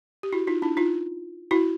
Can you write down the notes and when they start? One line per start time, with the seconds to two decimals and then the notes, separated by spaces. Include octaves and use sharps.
0.23 G4
0.33 E4 F#4
0.47 D#4 F4
0.62 D4 E4
0.77 D#4 F4
1.51 E4 F#4